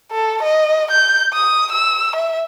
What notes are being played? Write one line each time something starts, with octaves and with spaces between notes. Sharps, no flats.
A4
D#5
G6
D#6
E6
E5